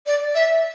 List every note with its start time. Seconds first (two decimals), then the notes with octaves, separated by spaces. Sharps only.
0.07 D5
0.35 E5